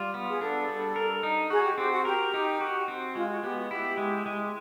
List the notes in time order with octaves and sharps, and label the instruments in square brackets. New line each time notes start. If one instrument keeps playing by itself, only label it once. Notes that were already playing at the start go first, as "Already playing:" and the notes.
Already playing: [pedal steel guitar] G3 F4
B3
[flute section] G#4
[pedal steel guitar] D4 [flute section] A4
[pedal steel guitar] G3
A#4
D#4
[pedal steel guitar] F#4 [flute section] G#4
[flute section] G4
[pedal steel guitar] C4 [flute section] G4
[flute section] F#4
[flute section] G4 [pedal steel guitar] A#4
[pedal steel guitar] D#4
F#4
C4
[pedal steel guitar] G#3 [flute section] F4
[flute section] F#4
[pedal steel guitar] B3 [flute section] G4
[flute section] F#4
[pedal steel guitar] E4 [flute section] G4
[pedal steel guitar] G#3
G#3